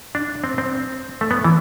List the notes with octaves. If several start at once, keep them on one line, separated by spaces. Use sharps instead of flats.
D4
C4
C4
A3
B3
E3